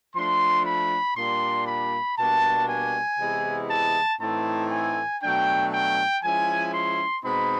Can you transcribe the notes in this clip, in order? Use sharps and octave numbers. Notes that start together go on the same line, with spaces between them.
F3 A3 D4 C6
B5
A#2 G3 A#3 D4 C6
B5
B2 G3 A#3 D4 A5
G#5
C3 E3 G#3 B3 E4
A5
A2 E3 A3 C4 D#4 A5
G#5
B2 F#3 A3 D4 G5
G5
F3 G#3 C#4 E4 G#5
C6
B2 G#3 C4 D#4 B5